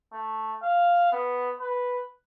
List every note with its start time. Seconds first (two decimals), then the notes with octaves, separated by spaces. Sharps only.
0.13 A3
0.63 F5
1.12 B3
1.60 B4